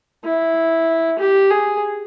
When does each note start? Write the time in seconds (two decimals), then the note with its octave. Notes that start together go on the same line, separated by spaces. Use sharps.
0.25 E4
1.19 G4
1.50 G#4